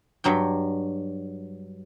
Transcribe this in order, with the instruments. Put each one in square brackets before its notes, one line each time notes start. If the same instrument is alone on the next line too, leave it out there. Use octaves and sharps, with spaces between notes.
[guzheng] G2 F#3 G5